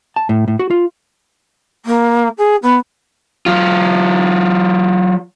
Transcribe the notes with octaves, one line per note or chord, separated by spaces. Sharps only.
A5
A2
A2
F#4
F4
A#3
G#4
B3
F#3 F4